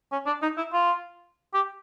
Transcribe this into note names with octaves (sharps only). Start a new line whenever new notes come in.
C#4
D4
D#4
E4
F4
G4